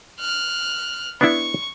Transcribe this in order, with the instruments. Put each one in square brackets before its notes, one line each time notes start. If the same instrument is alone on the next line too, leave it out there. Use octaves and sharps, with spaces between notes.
[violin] F6 F#6
[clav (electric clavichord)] B3 D4 E4 [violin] C#6